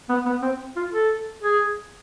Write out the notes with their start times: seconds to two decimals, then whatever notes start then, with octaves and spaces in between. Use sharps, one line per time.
0.09 B3
0.26 B3
0.42 C4
0.76 F4
0.93 A4
1.43 G#4